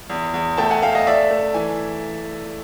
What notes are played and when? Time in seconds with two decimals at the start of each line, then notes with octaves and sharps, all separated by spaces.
0.10 E2
0.34 E2
0.58 A3 G5 A5
0.70 F#5 G#5
0.82 A3 F5 G5
0.94 D#5 F5
1.07 A3 D5 E5
1.31 A3
1.54 E3 G#5